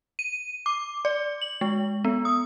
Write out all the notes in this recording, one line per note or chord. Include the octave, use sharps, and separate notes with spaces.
D#7
D6
D5
F#7
G#3
B3
D#6